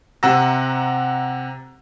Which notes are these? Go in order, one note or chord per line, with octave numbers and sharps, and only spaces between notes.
C3 F#5 A#5 E6 A#6